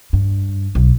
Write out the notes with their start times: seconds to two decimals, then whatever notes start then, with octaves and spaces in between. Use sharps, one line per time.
0.13 G2
0.75 B1